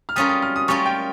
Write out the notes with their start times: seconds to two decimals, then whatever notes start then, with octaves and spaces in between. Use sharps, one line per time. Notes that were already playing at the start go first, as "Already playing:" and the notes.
0.09 F6
0.16 G3 C#4 F4 A#4 D#6
0.29 D#6
0.42 F6
0.56 D#6
0.68 G3 C#4 F4 A#4 C#6
0.86 G5